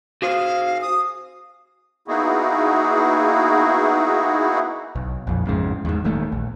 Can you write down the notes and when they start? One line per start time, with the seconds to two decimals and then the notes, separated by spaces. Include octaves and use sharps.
0.22 F#4 G#4 C5 F5
0.81 D#6
2.08 A#3 B3 D#4 E4 F#4 G#4
4.95 B1
5.27 A#1 F2
5.45 F2 G#2 C#3
5.85 E2 G#2
6.04 D#1 D#2 A3
6.32 A#1